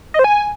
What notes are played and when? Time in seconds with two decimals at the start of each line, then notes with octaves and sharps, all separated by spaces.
0.14 D#5
0.19 C5
0.24 G#5